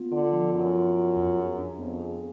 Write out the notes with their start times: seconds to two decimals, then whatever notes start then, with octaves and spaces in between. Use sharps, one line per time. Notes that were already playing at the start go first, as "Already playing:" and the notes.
Already playing: B3 F4
0.12 D3 F4
0.33 F3
0.54 F#2 F4
0.75 F4
0.96 F4
1.16 F2
1.37 G#4
1.58 D4
1.79 F2 B3
1.99 G#4